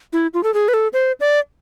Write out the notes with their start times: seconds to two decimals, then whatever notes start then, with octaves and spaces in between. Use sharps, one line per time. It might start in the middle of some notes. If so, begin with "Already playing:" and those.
0.13 E4
0.34 F4
0.43 A4
0.54 G#4
0.68 B4
0.74 A4
0.93 C5
1.20 D5